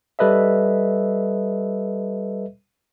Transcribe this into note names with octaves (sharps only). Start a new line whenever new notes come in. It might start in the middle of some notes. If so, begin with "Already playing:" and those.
G3 A4 B4 D#5 E5